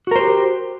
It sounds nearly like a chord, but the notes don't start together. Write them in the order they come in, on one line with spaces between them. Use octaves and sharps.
F#4 A#4 C5 G4